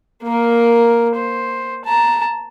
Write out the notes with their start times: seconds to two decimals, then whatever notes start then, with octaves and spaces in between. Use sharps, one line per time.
0.23 A#3 A#4
1.15 C5
1.85 A5 A#5